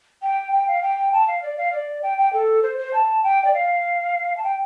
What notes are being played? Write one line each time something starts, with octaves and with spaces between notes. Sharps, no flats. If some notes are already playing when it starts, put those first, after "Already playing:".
G5
G5
F5
G5
A5
F5
D5
F5
D5
G5
G5
A4
C5
C5
A5
G5
D5
F5
A5
G5